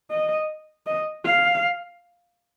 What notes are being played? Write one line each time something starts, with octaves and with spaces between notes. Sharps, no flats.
D#5
D#5
F5